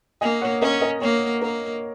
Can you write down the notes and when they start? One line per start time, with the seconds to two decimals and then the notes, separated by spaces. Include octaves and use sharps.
0.21 A#3 D#5 G#5
0.41 C#5 F#5
0.62 C#4 A#4 D#5
0.81 A#4 D#5
1.01 A#3 C#5
1.41 A#3 A#4